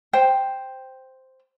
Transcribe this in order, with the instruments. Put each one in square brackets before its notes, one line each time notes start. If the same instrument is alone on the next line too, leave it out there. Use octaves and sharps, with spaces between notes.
[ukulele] C5 G5